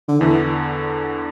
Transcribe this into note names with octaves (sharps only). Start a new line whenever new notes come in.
D3
E2 D3 E3 B3